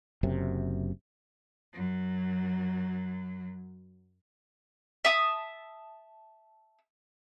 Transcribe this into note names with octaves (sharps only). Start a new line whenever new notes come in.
F#1 F#2 C3
F#2 F#3
E5 A5 D#6